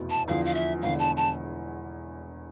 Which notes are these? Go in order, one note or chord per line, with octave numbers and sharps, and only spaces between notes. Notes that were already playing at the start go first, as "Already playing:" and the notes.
Already playing: F1 E2 B2
A5
E2 D3 F3 F5
F5
E5
E1 E2 D3 F5
A5
A5